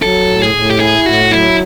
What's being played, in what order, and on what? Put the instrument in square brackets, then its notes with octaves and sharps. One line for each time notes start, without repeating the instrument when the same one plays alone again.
[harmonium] F#3 [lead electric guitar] A4
[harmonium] A2
[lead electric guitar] G#4
[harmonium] A2
[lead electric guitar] G4
[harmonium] E4 [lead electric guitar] G#4
[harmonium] A2 [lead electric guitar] F#4
[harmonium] F#3 [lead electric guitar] E4